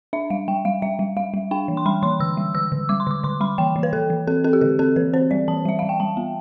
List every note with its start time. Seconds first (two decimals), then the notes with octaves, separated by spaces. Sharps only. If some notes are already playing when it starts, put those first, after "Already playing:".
0.13 D4 E5
0.30 G3 F5
0.48 G3 G5
0.65 G3 F5
0.82 G3 E5
0.99 G3
1.17 G3 F5
1.34 G3
1.51 D4 G5
1.68 E3
1.77 C6
1.86 G3 B5
2.03 E3 C6
2.20 D3 E6
2.37 G3
2.55 D3 E6
2.72 D3
2.89 G3 D6
3.00 C6
3.07 D3 D6
3.24 D3 C6
3.41 G3 B5
3.58 E3 G5
3.76 E3
3.83 B4
3.93 E3 A4
4.10 E3
4.27 C4 A4
4.44 C4 A4
4.53 G4
4.61 D3 A4
4.79 C4 A4
4.96 E3 B4
5.14 C4 C5
5.31 G3 D5
5.48 E3 A5
5.65 G3 E5
5.79 G3 F5
5.89 G5
6.00 G3 A5
6.17 B3